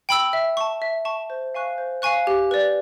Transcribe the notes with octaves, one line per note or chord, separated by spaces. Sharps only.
G5 B5 E6
E5
A5 C#6
E5
A5 C#6
C5
F5 G#5 C#6 F#6
C5
F5 G#5 C#6 F#6
G4
B4 D5